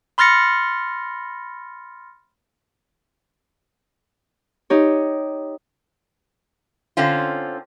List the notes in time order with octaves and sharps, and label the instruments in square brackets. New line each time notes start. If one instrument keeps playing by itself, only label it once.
[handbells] B5 C6 F6 A6 A#6 C#7
[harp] D#4 G4 C#5
[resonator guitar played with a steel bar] D3 C4 C#4 F4